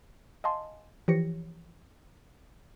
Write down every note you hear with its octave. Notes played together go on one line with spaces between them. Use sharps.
D#5 F5 G#5 A5 C6
E3 F3 G4 C#5 A#6 C#7